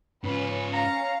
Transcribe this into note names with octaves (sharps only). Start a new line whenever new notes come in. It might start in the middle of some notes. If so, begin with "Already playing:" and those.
G#2 C#4 F4 B4
F5 A#5 C#7